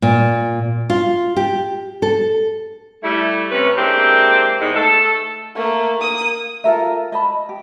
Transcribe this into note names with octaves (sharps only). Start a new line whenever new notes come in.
A#2
F4
G4
A4
G3 A3 E4
C3 C#4 B4
G#3 A#3 C4 D4 E4 G4
E2 G#2 D#4
A3 A4
A3 A#3
A#3 D#6
F4 A4 A#4 E5
D#5 A5 B5
G4